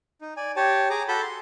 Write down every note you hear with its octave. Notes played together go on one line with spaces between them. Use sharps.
D#4
D5 G#5
G4 C#5 A5
G#4 A#5 D6
F#4 A4 A5 B5 G6
C6